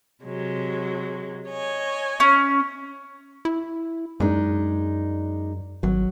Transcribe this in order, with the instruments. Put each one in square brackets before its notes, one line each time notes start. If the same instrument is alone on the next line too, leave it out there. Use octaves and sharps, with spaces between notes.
[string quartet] C3 F#3 G#3
C#5 D#5 G#5
[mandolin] C#4
[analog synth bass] E4
[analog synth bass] F#2 [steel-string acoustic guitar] G#3 D4 D#4
[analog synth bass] G#1 [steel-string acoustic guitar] F#3